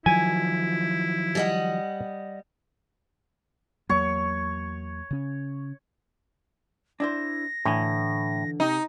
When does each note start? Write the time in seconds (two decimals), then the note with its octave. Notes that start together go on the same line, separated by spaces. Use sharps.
0.06 D#3 F3 F#3 E4 G#5
1.35 G3 D#5 F#5
3.89 E2 F#3 A#3 C#5 C#6
5.11 C#3 C#4
7.00 D4 E4 C5 A#6
7.65 A2 D3 E3 G#5
8.60 C3 D#4 D#5